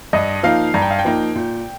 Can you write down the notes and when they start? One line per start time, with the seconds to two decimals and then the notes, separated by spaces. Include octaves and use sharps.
0.13 G2 D#5
0.43 F3 A#3 D#4 F5
0.74 G2 A#5
0.82 G5
0.91 F5
0.99 G5
1.05 F3 A#3 D#4
1.36 A#2